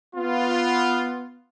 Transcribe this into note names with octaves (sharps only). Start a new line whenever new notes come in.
B3 F4